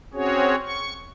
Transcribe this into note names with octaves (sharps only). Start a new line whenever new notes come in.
C4 C#4 F#4 G#4 C#5
C#6